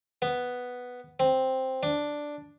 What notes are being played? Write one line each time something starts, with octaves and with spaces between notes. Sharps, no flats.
B3
C4
D4